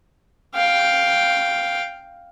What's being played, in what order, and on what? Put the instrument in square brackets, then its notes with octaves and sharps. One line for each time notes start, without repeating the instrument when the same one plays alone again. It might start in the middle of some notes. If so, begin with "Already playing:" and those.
[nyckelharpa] F5 G5